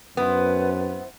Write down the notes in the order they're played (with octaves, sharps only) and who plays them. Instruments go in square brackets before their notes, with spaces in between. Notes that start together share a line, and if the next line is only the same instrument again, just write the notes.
[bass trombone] F#2 [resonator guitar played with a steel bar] B3 [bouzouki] C4 E4 C5 [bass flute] B4